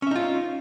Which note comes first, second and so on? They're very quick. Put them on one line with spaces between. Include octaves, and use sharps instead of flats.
C#4 E5 D#4 F4